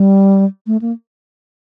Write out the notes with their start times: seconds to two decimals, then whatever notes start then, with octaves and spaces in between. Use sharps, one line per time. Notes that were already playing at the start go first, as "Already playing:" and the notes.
Already playing: G3
0.67 A3
0.82 A#3